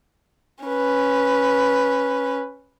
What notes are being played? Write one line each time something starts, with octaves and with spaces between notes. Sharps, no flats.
C#4 B4